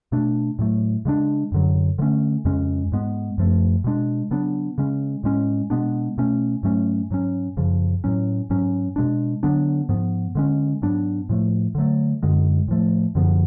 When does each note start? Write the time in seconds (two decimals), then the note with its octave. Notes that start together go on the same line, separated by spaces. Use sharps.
0.12 B2 A3 D4
0.59 A2 F#3 A3
1.05 C#3 G#3 B3 D4
1.52 F#2 D3 F#3
1.98 D3 F3 A3 C#4
2.45 F2 C#3 G#3 C#4
2.92 G#2 G#3 B3
3.38 F#2 F3 A3
3.84 B2 G#3 D4
4.31 C#3 F#3 B3 D4
4.78 C#3 G#3 C#4
5.24 A2 G#3 C#4
5.70 B2 G#3 B3 D4
6.18 B2 A3 C#4
6.63 G#2 F#3 A3 C#4
7.11 G#2 F#3 C#4
7.57 F#2 C#3 F3
8.04 A2 F#3 C#4
8.50 G#2 F#3 C#4
8.96 B2 G#3 D4
9.43 D3 F#3 B3 D4
9.89 G#2 F3 B3
10.35 D3 G#3 C#4
10.82 G#2 F#3 B3 D4
11.29 A2 F3 A3
11.75 D3 F#3 A3
12.23 F#2 D3 G#3
12.68 A2 F3 A3
13.15 F#2 D3 F3 B3